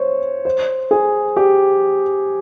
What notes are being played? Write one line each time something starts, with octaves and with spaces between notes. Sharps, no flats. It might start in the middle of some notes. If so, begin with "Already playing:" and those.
Already playing: C5 C#5
C5
G#4
G4